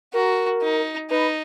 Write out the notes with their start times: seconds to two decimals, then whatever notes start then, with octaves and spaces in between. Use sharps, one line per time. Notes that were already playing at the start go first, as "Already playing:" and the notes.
0.13 F#4 A#4
0.62 D#4
1.10 D#4 B4